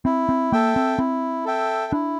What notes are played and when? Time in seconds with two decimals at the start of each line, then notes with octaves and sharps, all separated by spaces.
0.05 C4 E4
0.29 C4
0.52 A#3 A4 E5 G5
0.76 C4
0.98 C4 E4
1.45 A4 E5 G5
1.93 D4 E4